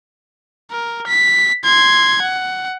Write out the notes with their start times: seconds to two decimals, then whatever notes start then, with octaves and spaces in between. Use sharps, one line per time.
0.71 A#4
1.08 B6
1.64 C6 G#6
2.22 F#5